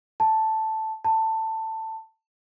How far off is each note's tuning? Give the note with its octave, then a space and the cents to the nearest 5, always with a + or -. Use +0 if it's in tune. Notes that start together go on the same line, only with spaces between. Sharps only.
A5 +0
A5 +15